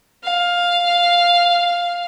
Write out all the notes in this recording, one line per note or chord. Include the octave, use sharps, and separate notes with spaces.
F5